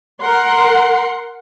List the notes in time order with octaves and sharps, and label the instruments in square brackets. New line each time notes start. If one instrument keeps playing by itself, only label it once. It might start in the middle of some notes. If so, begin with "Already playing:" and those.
[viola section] A#4 F#5 C6